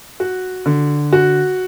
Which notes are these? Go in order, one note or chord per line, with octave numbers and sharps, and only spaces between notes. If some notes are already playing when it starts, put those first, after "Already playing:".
F#4
D3
F#4